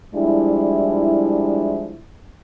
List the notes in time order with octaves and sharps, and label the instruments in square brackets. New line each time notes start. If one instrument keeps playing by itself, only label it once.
[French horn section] F3 G3 G#3 D4 E4